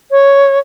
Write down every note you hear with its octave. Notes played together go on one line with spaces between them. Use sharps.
C#5